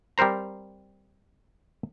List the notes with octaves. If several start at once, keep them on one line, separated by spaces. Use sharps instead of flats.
G3 C4 A#4 C5 A#5